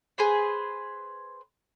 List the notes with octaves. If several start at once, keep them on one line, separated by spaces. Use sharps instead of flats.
G#4 B4 C5 B5